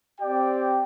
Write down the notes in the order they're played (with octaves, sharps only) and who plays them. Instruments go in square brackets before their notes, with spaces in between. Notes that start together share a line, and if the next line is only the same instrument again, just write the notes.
[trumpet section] C4 G4 D5 G5